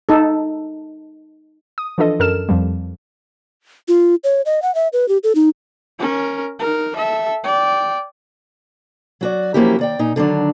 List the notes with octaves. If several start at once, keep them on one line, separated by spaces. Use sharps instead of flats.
D#4 A4
D#6
E3 F3 D4 F4 A4 D#5
F#2 A4 A#4 F6 E7
F2 F3 G3
F4
C#5
D#5
F#5
E5
B4
G4
A4
D#4
C#4 A#4
D#4 A#4
A4 E5
D5 G5
F#3 F#4 D5
F3 F#3 A#3 C#4 E4 G4
D#2 D5 G5
A#2 D#4
D3 D#3 F#3 D4